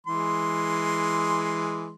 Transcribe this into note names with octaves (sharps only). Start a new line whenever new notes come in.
E3 G#3 C6